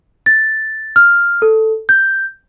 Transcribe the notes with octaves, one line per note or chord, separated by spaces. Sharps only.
A6
F6
A4
G6